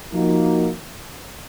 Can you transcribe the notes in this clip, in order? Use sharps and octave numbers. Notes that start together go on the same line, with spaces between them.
F3 A#3 D#4 F#4